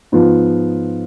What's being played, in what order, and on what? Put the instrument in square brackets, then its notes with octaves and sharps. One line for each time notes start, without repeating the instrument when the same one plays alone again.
[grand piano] G#2 F3 B3 F4